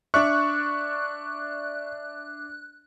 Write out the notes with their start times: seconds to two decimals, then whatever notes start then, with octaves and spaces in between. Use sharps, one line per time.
0.14 D4 D5 E5 C#6 F#6